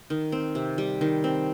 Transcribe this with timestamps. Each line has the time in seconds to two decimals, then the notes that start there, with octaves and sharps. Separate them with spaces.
0.10 D#3
0.32 C4
0.55 C3
0.78 G3
1.01 D#3
1.24 C4